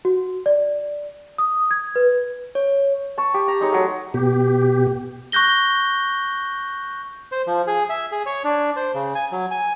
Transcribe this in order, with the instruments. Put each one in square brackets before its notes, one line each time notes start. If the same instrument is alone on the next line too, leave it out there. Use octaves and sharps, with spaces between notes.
[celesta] F#4
D5
D#6
G#6
B4
[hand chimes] C#5
[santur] A5 C#6
G4
A#5
G#3 D#4 C#5
F#3 A3
[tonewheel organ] B2 G4
[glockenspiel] C#6 F#6 G6 A#6 G7
[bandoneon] C5
F3
G#4
E5
G#4
C#5
D4
C5
C#3
G#5
F#3
G#5